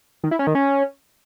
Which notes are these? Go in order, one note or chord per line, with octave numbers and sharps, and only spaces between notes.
D#3
E4
C#4
D#3
C#4